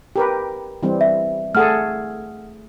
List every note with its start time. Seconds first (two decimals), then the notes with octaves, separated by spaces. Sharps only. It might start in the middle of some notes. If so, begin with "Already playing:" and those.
0.16 G4 A#4 B4
0.83 E3 G3 C4
1.01 E5
1.55 A3 G#4 A4 F#5 F6